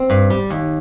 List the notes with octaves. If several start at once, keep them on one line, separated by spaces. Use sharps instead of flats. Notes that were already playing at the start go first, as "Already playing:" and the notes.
Already playing: C4
G2
G3
D#2